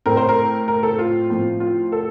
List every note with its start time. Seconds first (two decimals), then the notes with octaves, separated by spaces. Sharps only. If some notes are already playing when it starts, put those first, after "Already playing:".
0.06 A2 A3 C4 A#4
0.17 C5
0.29 A#4
0.68 A#4
0.83 A4
0.99 F4
1.30 A2 F3 C4
1.60 F4
1.92 A4